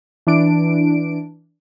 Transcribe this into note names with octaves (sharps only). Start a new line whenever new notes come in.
E3 D4 D7